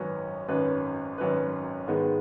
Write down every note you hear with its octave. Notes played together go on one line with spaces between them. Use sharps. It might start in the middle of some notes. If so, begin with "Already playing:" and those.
Already playing: G#1 F#2 F#3 C#4 B4
G#1 F#2 F#3 C#4 B4
G#1 F#2 F#3 C#4 B4
G#2 D#3 G#3 B3